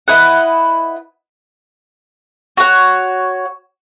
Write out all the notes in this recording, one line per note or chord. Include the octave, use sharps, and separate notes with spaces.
E4 B4 D#5 F#5
F#4 C#5 F#5